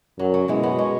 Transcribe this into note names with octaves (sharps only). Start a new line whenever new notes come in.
F#2 F#3
F#3
B2 E3 G#3
F#3 B3
G#3 C#4